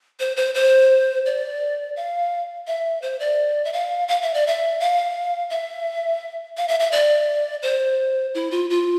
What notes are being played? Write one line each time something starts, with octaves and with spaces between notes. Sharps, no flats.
C5
C5
C5
D5
F5
E5
C5
D5
E5
F5
F5
E5
D5
E5
F5
E5
F5
E5
E5
D5
C5
E4
F4
F4